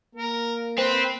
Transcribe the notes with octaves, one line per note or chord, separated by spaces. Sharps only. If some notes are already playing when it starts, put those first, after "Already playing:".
A#3 A#4
C4 B4 C5